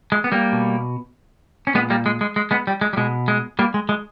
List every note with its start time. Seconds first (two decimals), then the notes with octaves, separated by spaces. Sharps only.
0.12 G#3
0.24 B3
0.32 G3 A#3
0.52 B2
1.67 C#4
1.74 A#2 G#3 B3
1.90 G3 A#3
2.06 G#3
2.21 G#3
2.36 G#3
2.51 G#3 B3
2.67 G3
2.81 G#3
2.93 G3
2.97 B2 G#3
3.28 G#3
3.59 G3 A#3
3.74 G#3
3.89 G#3